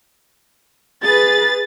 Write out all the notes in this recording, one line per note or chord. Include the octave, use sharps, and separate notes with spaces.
G#4 B4 A6